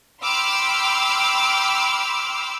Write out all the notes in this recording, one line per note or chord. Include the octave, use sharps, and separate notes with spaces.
G5 B5 C6 D6 E6 F6